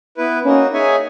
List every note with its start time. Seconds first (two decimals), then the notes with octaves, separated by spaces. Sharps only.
0.17 B3 E4 B4
0.45 A#3 C#4 D#4 F#4
0.73 D#4 G#4 C#5 E5 G#5